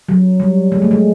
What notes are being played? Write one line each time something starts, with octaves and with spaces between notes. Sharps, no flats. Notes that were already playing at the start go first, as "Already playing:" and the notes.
F#3
G3
G#3
A3
G#3